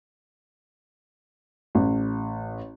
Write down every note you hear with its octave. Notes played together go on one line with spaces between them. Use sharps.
A1